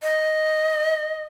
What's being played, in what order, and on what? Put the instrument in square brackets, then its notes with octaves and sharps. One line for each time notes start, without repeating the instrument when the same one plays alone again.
[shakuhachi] D#5